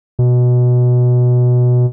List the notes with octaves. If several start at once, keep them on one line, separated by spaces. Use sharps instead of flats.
B2